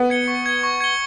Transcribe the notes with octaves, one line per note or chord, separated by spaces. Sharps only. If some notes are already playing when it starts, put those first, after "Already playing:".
Already playing: B3
G#6 C#7 G7
C#6
G#6 C#7 G7
C#6
G#6 C#7 G7